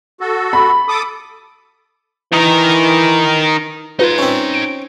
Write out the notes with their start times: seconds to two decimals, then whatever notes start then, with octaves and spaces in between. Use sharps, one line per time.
0.21 F#4 A4
0.53 B5
0.89 A4 D6 D#6
2.33 D#3 E3 A#4
3.99 D#4 F4 B4 C6
4.18 C4 C#4
4.54 D7